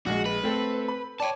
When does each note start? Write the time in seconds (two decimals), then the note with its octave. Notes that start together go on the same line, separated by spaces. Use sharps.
0.06 A#1 G#3 F#4
0.26 B4
0.44 A3 C4 A4
0.88 B5
1.20 C#5 D5 G5 A5